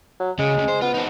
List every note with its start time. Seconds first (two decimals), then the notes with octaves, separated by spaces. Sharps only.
0.20 F#3
0.39 C#3 G#3
0.55 D2 C#3
0.68 C5
0.82 B3 F4
0.94 C4 D#4